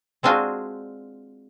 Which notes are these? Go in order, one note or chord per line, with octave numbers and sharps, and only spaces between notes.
G#3 C4 D4 F4 F#4 G#4